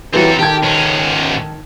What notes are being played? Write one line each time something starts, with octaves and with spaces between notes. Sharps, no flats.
E3 F#3 C4 G4 A4
D#3 G4 A4 G#6
G#2 C#4